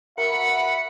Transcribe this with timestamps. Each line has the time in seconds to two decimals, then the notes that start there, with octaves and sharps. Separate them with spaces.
0.18 F#4 A#4 E5 F#5 B5 C#7